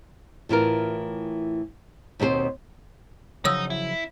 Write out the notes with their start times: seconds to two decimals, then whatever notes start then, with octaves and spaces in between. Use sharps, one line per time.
0.49 A2 E3 F4 A#4
2.20 D#2 B2 C4 G#4 C5
3.45 C#3 F3 F#3 D#4 C#5 D#6 E6
3.70 E4